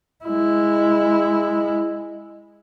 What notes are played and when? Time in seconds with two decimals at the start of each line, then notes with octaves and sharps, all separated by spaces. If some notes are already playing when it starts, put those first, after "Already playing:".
0.25 G#3 E4